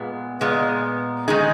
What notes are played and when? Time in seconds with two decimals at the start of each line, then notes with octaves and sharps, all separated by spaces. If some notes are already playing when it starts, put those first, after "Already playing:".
Already playing: A#2 G#3 B3
0.41 A#2 G#3 B3
1.28 D#3 G#3 D#4 G#4